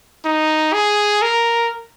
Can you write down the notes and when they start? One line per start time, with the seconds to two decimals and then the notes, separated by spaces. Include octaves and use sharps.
0.25 D#4
0.73 G#4
1.22 A#4